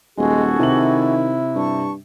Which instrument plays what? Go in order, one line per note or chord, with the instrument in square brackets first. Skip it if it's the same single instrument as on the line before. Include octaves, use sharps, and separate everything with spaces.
[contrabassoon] D#1 [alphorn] G#3 [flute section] F#4 G#4 A4
[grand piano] C3 F#7 [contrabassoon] D#3 [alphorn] E4
[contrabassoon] G2 [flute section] A5 C#6